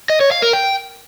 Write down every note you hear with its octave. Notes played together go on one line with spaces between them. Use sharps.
D#5
C#5
F5
A#4
G5